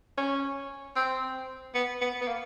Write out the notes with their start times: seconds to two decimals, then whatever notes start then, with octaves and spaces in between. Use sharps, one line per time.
0.18 C#4
0.96 C4
1.75 B3
2.01 B3
2.21 B3
2.28 A#3